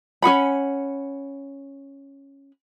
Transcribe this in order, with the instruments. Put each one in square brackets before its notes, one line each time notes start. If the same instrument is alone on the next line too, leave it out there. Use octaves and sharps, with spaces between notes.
[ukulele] C#4 G#4 F#5 B5